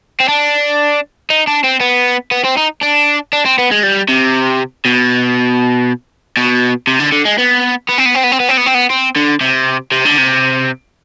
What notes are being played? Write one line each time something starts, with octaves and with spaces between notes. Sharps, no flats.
C4
D4
D#4
D4
C4
B3
B3
C4
D#4
D4
D4
C4
B3
G#3
G3
C3
B2
B2
C3
D3
D3
G#3
B3
B3
C4
B3
C4
B3
C4
B3
C4
B3
C4
B3
C4
D3
C3
C3
D3
C3